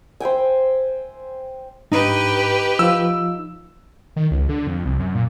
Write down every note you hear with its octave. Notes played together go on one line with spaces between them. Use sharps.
C5 E5 G5 G#5
G#2 D#4 G4 B4
F3 F4 E6
D#3
C#2
D3
F2
C2
F#2
A#2